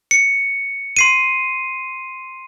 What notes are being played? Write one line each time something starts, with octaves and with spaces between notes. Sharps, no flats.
C#7
C6 C7 D#7